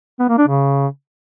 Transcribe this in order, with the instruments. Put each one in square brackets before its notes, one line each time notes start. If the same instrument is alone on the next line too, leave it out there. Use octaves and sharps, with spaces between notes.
[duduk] B3
A#3
D4
C#3